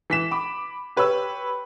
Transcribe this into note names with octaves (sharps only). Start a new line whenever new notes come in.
E3 B6 E7
B5 D6
G4 B4 C#5 B5 E6